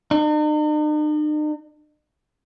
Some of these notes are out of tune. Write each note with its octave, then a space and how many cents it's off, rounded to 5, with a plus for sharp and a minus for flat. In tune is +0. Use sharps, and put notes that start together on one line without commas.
D#4 -45